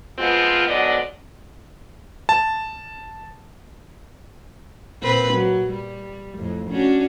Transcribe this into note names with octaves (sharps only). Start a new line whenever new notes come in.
F3 G#3 B3 C4 F4
G#2 D3 F#3 B3 D5 D#5
A5
A#2 C4 B4
F#3
G3
F2 A2
C#4 D4 F#4